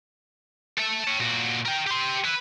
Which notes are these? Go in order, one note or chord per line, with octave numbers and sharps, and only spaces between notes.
A4 E5
C#5 A5
A#2 F#4
A#4 G5
G4 C6
E4 B4